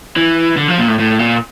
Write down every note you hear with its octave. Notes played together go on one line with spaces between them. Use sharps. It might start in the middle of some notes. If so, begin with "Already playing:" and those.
E3
D3
F3
A#2
A2
A2
A#2